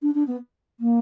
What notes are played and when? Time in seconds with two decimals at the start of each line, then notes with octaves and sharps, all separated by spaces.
0.02 D4
0.14 D4
0.27 B3
0.80 A#3